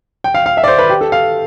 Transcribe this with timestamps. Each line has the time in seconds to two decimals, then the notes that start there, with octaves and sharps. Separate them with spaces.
0.24 G5
0.34 F5
0.46 F5
0.57 E5
0.64 D5
0.68 C5
0.78 B4
0.90 G4
1.01 A4
1.12 F5